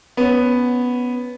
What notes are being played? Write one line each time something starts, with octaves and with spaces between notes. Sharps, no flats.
B3 C#4